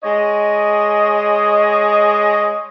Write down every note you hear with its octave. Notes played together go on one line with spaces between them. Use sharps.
G#3 C#5 D#5